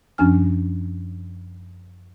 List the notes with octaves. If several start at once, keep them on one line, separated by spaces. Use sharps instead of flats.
F#2 F3 C#4 D4 G#5 F6